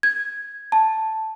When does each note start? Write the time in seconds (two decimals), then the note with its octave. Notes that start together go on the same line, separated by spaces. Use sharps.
0.03 G#6
0.72 A5